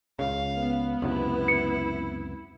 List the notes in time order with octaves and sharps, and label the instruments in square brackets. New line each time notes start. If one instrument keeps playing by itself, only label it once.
[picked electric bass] C#2 C#3 [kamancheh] F5
[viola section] B3
[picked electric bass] C#2 F#2 C3 [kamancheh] E4
[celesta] C#7